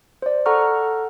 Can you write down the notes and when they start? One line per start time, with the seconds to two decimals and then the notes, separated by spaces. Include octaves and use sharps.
0.22 C5 D5
0.46 A4 F#5 A#5 C#6 F6